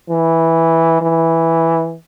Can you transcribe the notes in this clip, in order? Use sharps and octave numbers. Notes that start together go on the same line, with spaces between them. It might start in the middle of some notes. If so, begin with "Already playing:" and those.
E3
E3